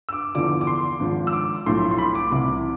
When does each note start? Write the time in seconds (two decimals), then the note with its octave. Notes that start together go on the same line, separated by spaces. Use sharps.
0.09 E6
0.13 D6
0.35 E2 D3 F3 D6
0.61 D6
0.67 C6
1.00 G#1 G#2 F3
1.27 E6
1.33 D6
1.66 B1 A2 F3 C6
1.91 C6
1.98 B5
2.15 D6
2.32 C2 C3 E3 D6